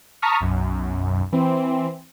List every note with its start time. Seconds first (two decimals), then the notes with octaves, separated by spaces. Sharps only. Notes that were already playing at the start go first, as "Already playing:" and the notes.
0.22 A5 A#5 C#6 D#6 F6 B6
0.41 B1 F#2
1.32 E3 C4